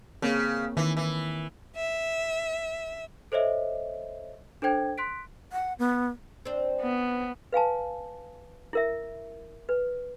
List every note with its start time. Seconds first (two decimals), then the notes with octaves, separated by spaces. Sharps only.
0.22 C#3 A#3 C4 A#4
0.77 D#3 E3
0.97 E3
1.76 E5
3.32 A4 C5 C#5 D#5 E5
4.62 D4 A4 C5 G5 G#6
4.98 C6 F#6 B6 D7
5.52 F#5
5.79 B3
6.45 C4 D4
6.81 B3
7.53 B4 F5 G#5 A5
8.73 E4 A#4 E5
9.69 B4